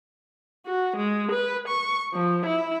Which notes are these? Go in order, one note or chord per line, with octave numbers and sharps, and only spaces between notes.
F#4
G#3
B4
C#6
F3
E4